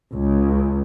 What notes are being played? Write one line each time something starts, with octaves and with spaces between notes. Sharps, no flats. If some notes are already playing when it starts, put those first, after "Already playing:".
C#2